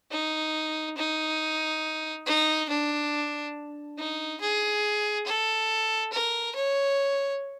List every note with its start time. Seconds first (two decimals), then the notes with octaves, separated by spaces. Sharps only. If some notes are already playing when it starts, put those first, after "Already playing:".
0.11 D#4
0.97 D#4
2.26 D#4
2.69 D4
3.98 D#4
4.40 G#4
5.26 A4
6.12 A#4
6.55 C#5